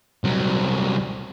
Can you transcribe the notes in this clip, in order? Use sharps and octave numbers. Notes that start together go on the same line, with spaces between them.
C2 F#3